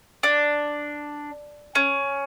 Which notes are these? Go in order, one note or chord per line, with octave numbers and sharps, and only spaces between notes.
D4
C#4